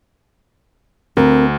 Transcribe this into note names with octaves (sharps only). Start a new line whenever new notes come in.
D2 C4 A#4